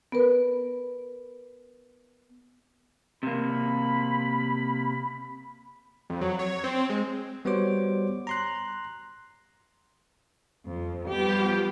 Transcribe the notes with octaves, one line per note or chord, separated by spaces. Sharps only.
B3 A#4 B4
C3 A#3 B5
F2
F#3
C#5
C4
G#3
G3 B3 F#4 C5 C#5 D6
A#5 C6 F#6
F2
F3 G3 B3 G4 F5